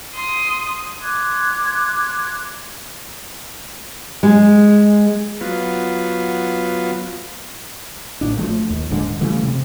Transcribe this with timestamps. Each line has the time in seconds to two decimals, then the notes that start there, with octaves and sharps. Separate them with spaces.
0.15 C6 D#6
0.99 C6 D6 F#6 G#6
4.23 G#3
5.41 F#3 B3 F4
8.21 A#1 A2 D4
8.37 F3 F#3 A3
8.70 D#2
8.90 D#1 G#2 D3 D4
9.21 C#3 E3 G3 A3
9.43 C3